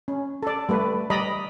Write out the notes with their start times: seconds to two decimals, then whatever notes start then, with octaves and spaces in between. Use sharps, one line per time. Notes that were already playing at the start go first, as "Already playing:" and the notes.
0.08 C#4
0.43 A4 D5
0.69 G3 A3 B4
1.10 G3 D5 D#5 A#5 B5